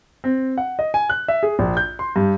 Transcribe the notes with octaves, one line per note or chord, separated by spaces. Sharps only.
C4
F#5
D#5
G#5
F#6
E5
G#4
A#1
G6
C6
G2